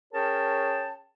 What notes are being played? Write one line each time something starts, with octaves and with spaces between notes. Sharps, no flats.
C#4 G#4 A#4 C#5 G5 A5